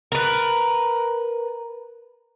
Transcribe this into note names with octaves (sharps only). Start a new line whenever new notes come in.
A#4 B4